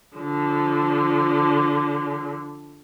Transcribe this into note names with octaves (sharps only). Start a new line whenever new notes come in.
D3 F3